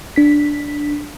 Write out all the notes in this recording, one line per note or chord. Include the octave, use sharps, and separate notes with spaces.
D4 B6